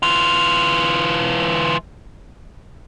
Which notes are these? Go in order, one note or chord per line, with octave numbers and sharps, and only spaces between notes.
E3 F4